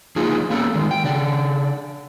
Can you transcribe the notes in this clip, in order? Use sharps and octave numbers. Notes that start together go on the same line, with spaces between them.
D3 F3 A#3 D#4 F4 G#4
A#3 B3 C#4 A4
D3 D#3 G#3
G5
C#3 D4 D5